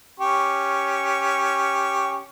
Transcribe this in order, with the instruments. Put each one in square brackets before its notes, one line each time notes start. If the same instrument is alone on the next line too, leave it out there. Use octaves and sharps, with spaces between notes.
[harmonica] C#4 G4 C#6